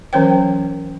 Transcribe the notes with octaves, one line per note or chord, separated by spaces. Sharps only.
E3 F#3 C#4 C5 C#5 G5